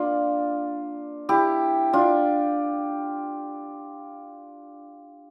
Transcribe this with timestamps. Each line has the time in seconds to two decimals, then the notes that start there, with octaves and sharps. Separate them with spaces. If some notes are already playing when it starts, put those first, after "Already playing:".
Already playing: A#3 D4 F4
1.29 E4 G4
1.93 D4 F4